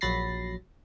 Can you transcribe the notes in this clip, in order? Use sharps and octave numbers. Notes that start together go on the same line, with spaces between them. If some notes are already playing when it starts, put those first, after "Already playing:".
A#1 F#3 B5 A6 A#6 C7